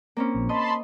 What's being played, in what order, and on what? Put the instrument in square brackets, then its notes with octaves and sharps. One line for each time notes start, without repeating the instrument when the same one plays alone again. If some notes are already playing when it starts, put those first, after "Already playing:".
[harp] A#3 C4 C#4
[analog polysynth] A#1
[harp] D#5 [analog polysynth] A5 B5 C6